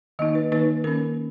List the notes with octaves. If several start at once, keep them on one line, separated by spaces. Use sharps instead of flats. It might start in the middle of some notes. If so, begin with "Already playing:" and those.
D#3 A#3 D#4 D#5
B4
D#3 A#3 D#4 B4
D#3 A#3 C#4 A#4